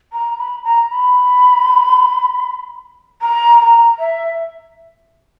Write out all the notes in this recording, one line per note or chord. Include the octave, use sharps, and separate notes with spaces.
A#5
B5
A#5
B5
A#5
A#5
E5